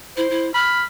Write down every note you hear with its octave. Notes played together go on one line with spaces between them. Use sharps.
E4 C5
E4
B5 F6